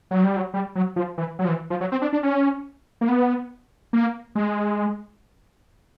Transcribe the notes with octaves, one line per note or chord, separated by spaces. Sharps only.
F#3
G3
F#3
G3
F#3
F3
E3
F#3
F3
E3
F3
F#3
C4
D4
D4
C#4
A#3
B3
A#3
G#3